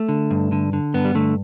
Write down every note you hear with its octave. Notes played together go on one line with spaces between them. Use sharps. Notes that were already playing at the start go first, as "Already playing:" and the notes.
Already playing: A3
D3
G2
D3
D3
G2 B3
G3
D3 A3